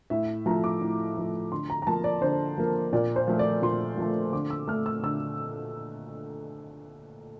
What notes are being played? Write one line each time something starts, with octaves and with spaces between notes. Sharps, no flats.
A2 E5
F3 A3 A#5
D6
A2
F3 A3
D3 C6
A#5
A#5
F3 A#3 A5
D5
D3 C5
F3 A#3
A#2 D5
C5
F3 A3
D5
A#2 C6
F3 A3
D3 D6
E6
A3 F6
E6
D3 E6